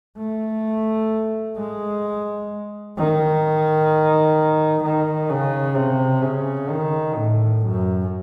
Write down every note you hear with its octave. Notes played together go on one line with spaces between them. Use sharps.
A3
G#3
D#3
D#3
C#3
C3
C#3
D#3
A2
F#2